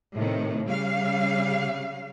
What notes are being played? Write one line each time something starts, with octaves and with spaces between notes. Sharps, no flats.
A2 C3 D#3
C#3 G3 F5